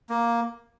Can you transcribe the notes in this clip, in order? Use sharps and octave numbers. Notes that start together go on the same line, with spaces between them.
A#3